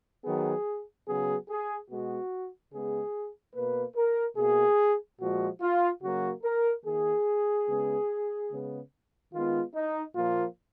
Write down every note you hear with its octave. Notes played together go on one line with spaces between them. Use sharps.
D#3 F#3 B3 G#4
C#3 F#3 B3 G#4
G#4
B2 G#3 B3 F#4
C#3 G#3 B3 G#4
B2 A#3 B4
A#4
B2 A#3 G#4
A#2 F3 G#3 F#4
F4
C#3 F#3 A#3 F#4
A#4
D#3 A#3 G#4
C#3 G#3 B3
C#3 G#3 B3
D#3 G#3 B3 F4
D#4
A#2 F3 A#3 F4